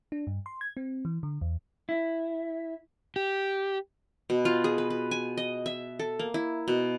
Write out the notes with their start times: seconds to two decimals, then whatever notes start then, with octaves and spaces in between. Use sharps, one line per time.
0.12 D4
0.27 G2
0.46 C6
0.61 G#6
0.77 C4
1.05 E3
1.23 D3
1.41 E2
1.89 E4
3.16 G4
4.30 B2
4.45 F4
4.64 G#4
4.78 B4
4.90 B4
5.11 G#5
5.37 D#5
5.66 E5
5.99 A4
6.19 A#3
6.34 E4
6.68 B2